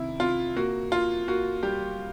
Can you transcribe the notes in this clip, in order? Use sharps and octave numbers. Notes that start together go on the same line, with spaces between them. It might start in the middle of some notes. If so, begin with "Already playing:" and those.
Already playing: C3 D#3 E4
C3 F4
A#3 F#4
A#3 F4
A#3 F#4
G3 G4